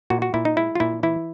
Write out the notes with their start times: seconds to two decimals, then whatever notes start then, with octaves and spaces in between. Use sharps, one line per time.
0.10 A#2 F#4
0.22 F#4
0.34 A#2 E4
0.45 D#4
0.57 G#3 E4
0.75 F4
0.80 A#2 E4
1.03 E3 E4